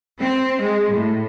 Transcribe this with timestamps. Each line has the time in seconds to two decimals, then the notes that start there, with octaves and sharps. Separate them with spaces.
0.20 C4
0.61 G#3
0.93 A2